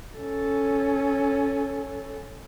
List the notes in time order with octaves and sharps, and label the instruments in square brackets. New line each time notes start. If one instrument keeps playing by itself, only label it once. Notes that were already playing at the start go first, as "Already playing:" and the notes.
[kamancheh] C#4 A4